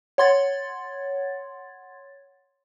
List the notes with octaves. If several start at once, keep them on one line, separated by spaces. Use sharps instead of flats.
C#5 F#5 C6 G#6 A6